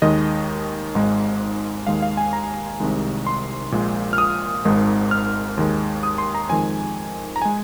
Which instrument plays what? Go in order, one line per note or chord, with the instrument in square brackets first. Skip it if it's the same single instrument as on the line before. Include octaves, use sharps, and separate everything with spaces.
[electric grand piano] D#2 D#3 G#3 D#5
G#1 G#2 G#3
D#2 D#3 G#3 F5
F5
G#5
A#5
C2 C3 D#3 G#3
C6
A#1 A#2 G#3
F6
D#6
G#1 G#2 D#3 G#3
F6
D#2 D#3 G#3
D#6
C6
A#5
F2 D#3 G#3 G#5
A#5
G#3 G#5